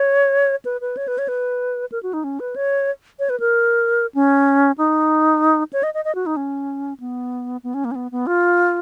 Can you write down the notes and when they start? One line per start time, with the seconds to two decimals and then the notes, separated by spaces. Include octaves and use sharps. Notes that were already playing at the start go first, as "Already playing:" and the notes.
Already playing: C#5
0.65 B4
0.81 B4
0.97 C#5
1.08 B4
1.18 C#5
1.28 B4
1.92 A#4
2.03 F#4
2.13 D#4
2.24 C#4
2.40 B4
2.56 C#5
3.19 C#5
3.30 B4
3.40 A#4
4.15 C#4
4.78 D#4
5.73 C#5
5.83 D#5
5.94 D#5
6.05 D#5
6.15 F#4
6.26 D#4
6.37 C#4
7.00 B3
7.64 B3
7.74 C#4
7.85 A#3
7.91 C#4
7.95 B3
8.12 B3
8.27 F4